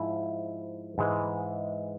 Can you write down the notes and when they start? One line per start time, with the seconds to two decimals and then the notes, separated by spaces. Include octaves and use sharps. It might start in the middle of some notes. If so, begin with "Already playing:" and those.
Already playing: G#2 F3 E4
0.98 G#2 E3 G#3